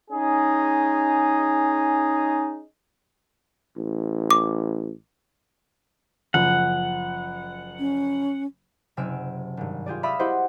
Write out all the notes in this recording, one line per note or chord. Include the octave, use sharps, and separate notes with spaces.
C#4 D#4 G#4
A1
D6
F#1 F3 F#5
C#4
F#1 C3 G#5 E6 F6 D7
G#1 G2
F4 G4 G#4 D5
D5 E5 F5 B5 D#6 E6
E4 F#4 G4 C5 D#5 F#5